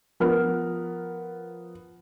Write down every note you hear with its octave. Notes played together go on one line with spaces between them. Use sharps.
F3 B3 A#4 F6